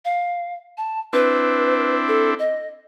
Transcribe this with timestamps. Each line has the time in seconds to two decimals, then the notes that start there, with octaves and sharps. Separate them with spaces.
0.05 F5
0.77 A5
1.13 C4 D4 E4 B4
2.08 A4
2.39 D#5